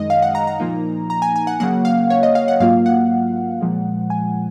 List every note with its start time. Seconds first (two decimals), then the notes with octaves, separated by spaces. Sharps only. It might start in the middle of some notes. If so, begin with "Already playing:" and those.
Already playing: F#2 D#3 G#3 D#4 D#5
0.10 F5
0.22 F#5
0.35 A#5
0.47 A#5
0.60 A#2 F3 A#3 D#4
1.10 A#5
1.22 G#5
1.36 G#5
1.47 F#5
1.60 C#3 F#3 A#3 F#5
1.85 F5
2.10 C#5
2.23 D#5
2.35 F5
2.48 F#5
2.60 G#2 F#3 A#3 F4 F5
2.86 F#5
3.61 A#2 F3 G#3
4.10 G#5